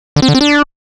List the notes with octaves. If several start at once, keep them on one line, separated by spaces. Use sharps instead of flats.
D3
C4
D3
C4
D4